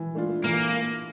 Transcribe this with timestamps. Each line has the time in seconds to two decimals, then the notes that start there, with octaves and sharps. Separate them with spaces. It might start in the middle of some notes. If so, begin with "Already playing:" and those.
Already playing: E3
0.15 A3 D4 F4
0.44 E3 A#3